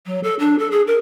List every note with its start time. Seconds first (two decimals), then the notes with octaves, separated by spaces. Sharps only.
0.06 F#3
0.23 A4
0.39 D4
0.59 A4
0.71 G#4
0.87 A#4